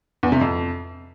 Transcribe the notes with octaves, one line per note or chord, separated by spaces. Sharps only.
E2
C3
F2